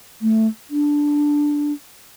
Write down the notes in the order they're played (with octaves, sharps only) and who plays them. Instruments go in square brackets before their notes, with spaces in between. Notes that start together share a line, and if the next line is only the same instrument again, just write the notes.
[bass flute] A3
D4